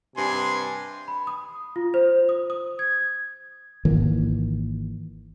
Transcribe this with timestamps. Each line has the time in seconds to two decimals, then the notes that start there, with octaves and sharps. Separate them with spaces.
0.16 G2 C3 G#5 C6
1.08 B5
1.27 D#6
1.76 F4
1.94 C5
2.29 D#6
2.50 D#6
2.79 G#6
3.85 G#1 D#3 E3 A#3